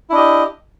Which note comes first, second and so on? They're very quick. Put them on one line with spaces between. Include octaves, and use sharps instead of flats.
E4 D4 D#5 G4